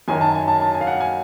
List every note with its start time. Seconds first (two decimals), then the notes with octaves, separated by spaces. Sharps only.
0.08 F#2 D#3 F#3 G#5
0.21 A5
0.35 G#5
0.48 A5
0.61 A5
0.74 G#5
0.81 F5
0.87 F#5
1.00 G#5